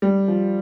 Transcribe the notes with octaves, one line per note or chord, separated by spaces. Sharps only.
G3
F3